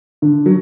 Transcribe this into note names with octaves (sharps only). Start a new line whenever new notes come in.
D3
F#3